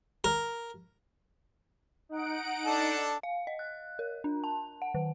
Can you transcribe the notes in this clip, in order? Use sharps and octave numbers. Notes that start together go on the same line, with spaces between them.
A#4
D#4 F#5 D7
D4 A4
F5
D#5
F#6
A#4
D4
A5
F#5
D#3